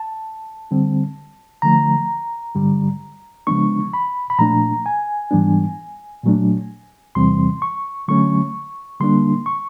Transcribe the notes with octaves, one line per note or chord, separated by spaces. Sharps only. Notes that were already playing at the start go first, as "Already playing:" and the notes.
Already playing: A5
D3 G3 C4
D3 F3 A3 A#5
G2 D3 G3
C#3 F3 G#3 B3 D4 C#6
B5
B5
A#2 F3 A3 D4 A#5
G#5
G#2 E3 G3 B3 D4
A#2 F#3 A3 D4
E2 C3 E3 G3 C4 C6
C#6
D3 F#3 A3 C#4 C#6
D3 G3 A#3 D4 C6
C#6